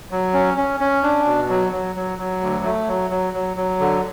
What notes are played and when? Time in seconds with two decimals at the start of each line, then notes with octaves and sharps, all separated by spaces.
0.11 F#3
0.34 C#4
0.58 C#4
0.80 C#4
1.03 D4
1.26 B2
1.49 F#3
1.73 F#3
1.96 F#3
2.19 F#3
2.41 D2
2.64 A3
2.88 F#3
3.11 F#3
3.34 F#3
3.57 F#3
3.80 D3